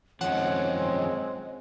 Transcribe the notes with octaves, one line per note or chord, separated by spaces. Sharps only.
F#2 D#3 F3 G#3 C4 C#5 F#5